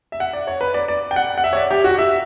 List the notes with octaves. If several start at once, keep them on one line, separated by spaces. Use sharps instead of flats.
E5
F#5
D5
C#5
B4
D5
D5
G5
F#5
F#5
E5
C#5
D5
G4
F#4
E5